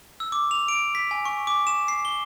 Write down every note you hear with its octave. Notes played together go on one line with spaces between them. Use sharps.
E6
D6
F7
D7
B6
G#5
C#6
D6
E7
C7
G7